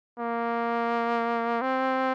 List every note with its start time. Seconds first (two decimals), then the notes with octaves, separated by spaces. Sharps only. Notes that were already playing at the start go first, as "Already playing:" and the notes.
0.19 A#3
1.62 C4